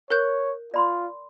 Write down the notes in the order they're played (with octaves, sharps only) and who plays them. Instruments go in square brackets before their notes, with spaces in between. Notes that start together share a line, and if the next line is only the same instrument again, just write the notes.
[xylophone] A#4 F#6 G6 [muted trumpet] C#5
[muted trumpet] F4 [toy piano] D5 B5 C6